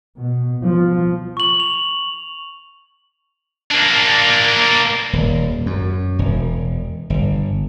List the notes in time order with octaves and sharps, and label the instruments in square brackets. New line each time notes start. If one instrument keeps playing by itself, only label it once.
[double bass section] B2
F3
[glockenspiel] C#6 F#7
F7
[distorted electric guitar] A#3 D4
[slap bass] D#1
F#2
E1
G1